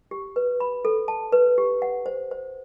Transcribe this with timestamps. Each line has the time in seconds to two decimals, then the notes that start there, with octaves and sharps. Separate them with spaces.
0.11 G4
0.36 B4
0.60 B5
0.85 A4
1.08 A5
1.32 B4
1.58 G4
1.82 F#5
2.06 C5
2.31 C5